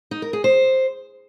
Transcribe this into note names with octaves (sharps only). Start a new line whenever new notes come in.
D#4
A#4
G#4
C5